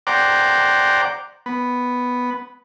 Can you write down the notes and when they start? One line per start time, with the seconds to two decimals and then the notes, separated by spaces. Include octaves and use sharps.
0.07 C5 D5 F#5 G5 A#5 D6
1.46 B3